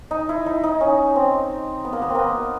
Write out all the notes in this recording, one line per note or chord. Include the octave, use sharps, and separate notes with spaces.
D#4
E4
D#4
D#4
C#4
C4
B3
A#3
B3
C4
A#3 B3